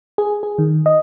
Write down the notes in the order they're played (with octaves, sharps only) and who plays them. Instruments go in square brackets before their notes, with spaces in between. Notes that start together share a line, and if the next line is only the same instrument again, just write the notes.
[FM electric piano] G#4
G#4
D#3
D#5